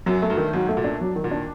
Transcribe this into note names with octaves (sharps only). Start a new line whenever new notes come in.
F#2 F#3
A3
G2
D#3
G#2 F#3
A3
A#2
D4
F#3
D#3
A#2
D4